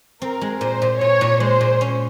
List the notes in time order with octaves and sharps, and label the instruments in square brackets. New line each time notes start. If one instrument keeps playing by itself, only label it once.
[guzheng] C4 [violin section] A#4
[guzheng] G#3
[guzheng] A#2 [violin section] C5
[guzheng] A#2
[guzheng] A#2 [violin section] C#5
[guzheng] A#2
[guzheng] G#3 [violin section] C5
[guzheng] A#2
C#4